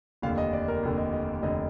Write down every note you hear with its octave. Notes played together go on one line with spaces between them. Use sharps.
F1 D#2 D3 F5
D#5
D5
A#4
F1 D#2 D3
D#5
D#5
F1 D#2 D3 D#5